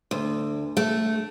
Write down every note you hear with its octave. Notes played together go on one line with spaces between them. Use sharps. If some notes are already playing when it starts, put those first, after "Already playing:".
D2
A3